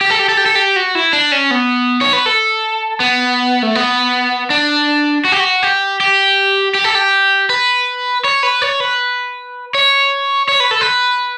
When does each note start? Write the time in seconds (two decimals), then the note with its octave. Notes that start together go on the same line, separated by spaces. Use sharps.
0.01 G4
0.10 A4
0.19 G4
0.29 A4
0.37 G4
0.46 A4
0.55 G4
0.76 F#4
0.95 E4
1.13 D4
1.32 C#4
1.51 B3
2.01 C#5
2.13 B4
2.26 A4
3.00 B3
3.63 A3
3.75 B3
4.50 D4
5.25 F#4
5.32 G4
5.40 F#4
5.63 G4
6.00 G4
6.75 G4
6.84 A4
6.95 G4
7.50 B4
8.24 C#5
8.43 B4
8.62 C#5
8.80 B4
9.75 C#5
10.49 C#5
10.60 B4
10.71 A4
10.81 B4